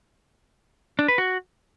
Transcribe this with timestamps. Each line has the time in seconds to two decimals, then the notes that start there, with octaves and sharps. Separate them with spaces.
0.99 D4
1.08 B4
1.18 F#4